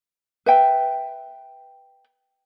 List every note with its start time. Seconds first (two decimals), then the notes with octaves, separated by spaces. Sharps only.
0.46 B4 E5 G5